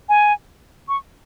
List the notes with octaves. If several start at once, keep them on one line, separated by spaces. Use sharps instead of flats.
G#5
C#6